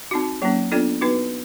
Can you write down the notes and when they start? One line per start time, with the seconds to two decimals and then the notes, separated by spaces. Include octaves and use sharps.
0.11 C4 D#4 F#4
0.42 F#3 A#3 C#4
0.72 B3 D4 F4 A4 D5
1.01 B3 D#4 F#4 B4